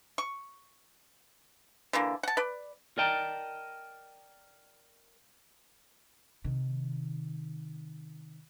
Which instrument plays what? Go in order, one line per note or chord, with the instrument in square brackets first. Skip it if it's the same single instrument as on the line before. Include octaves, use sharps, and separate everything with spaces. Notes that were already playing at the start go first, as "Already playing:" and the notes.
[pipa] C#6
D3 E3 A#3
F#5 A5
B4 D5
[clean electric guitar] A#4 D5 D#5 G5 A5 A#5
[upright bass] C3 D#3